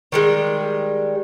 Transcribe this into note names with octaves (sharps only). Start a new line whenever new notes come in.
D#3 G3 G#3